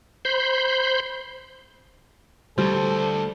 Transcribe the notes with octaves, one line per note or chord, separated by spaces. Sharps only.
C5 B5 C6 G6
D2 G3 A4 C5